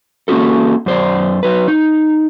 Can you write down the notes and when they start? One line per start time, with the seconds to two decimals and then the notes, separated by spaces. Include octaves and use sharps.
0.28 A#3 C#4 E4 F#4 A4
0.86 F#2 C5 D5
1.43 F#3 B4
1.68 D#4